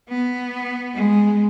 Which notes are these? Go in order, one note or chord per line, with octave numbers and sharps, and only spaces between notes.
B3
G#3